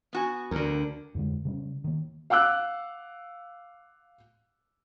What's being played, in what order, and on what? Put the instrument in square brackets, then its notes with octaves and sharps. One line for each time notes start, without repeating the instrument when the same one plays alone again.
[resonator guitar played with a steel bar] B3 F#4 G#5
[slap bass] D2 D3 [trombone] A#4
[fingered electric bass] F2 D3 G#3
C#3 G3 C#4
D#3 A#3
[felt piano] F5 F#5 D6 E6 F#6